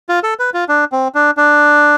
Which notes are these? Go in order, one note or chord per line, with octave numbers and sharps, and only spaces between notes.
F4
A4
B4
F4
D4
C4
D4
D4